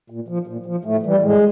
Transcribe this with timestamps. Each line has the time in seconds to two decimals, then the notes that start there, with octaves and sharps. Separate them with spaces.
0.10 A#2
0.28 F3
0.47 A#2
0.66 F3
0.85 A2 A3
1.03 E3 G3
1.22 A2 G#3